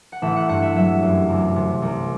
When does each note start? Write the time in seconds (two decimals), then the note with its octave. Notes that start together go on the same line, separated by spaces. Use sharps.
0.12 F#5
0.22 A1 E5
0.36 F#5
0.49 G2 F#5
0.62 E5
0.75 F#3 E5
1.03 F#2
1.29 C2
1.56 C3
1.82 C2